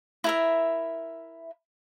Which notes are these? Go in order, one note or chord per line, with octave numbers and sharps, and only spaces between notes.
E4 A#4 E5